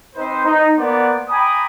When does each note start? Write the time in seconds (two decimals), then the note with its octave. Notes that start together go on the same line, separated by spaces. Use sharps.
0.16 C4 D#4 B4 C5
0.45 D#4
0.77 A#3 B3 C5 D5 F#5
1.29 G5 G#5 A#5 B5 D6 D#6